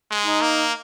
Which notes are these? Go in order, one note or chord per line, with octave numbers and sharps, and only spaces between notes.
G#3
D#4
A#3